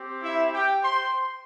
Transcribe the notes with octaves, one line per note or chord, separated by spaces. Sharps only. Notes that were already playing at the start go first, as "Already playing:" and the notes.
Already playing: C4 G4
E4 E5
G4 G5
C5 C6